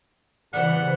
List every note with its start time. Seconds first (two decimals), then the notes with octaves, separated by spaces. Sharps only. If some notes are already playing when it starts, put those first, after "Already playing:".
0.53 C#3 E3 G3 B3 C5 F#5